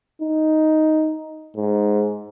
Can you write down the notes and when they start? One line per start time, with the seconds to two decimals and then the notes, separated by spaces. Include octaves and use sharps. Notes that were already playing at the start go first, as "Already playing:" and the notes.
0.22 D#4
1.56 G#2